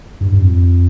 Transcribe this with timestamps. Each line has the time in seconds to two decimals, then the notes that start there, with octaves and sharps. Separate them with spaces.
0.21 G2
0.32 G2
0.42 F2